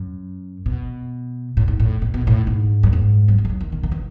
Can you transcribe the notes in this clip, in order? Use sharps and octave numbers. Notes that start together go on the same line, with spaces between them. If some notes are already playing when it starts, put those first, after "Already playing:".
Already playing: F#2
B2
A2
G#2
A2
A2
B2
A2
G#2
F#2
G#2
F#3
E3
G#3
F#3
D#3
D#3
D#3
E3